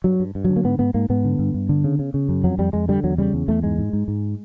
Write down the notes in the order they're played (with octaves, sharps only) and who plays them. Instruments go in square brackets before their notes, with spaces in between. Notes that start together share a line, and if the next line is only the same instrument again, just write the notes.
[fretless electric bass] G2 F#3
G2
G2
D3 F#3
A#3
G#2 B3
G#2 B3
G#2 A#3
G#2 B3
D3
G2
G2
D3
C#3
C#3
C#3
F#2
F2 F#3
F2 G3
F2 G#3
D3 G3
E2 F#3
C#3 G3
E2
E2 A3
G#2 G#3
G#2
G#2
G#2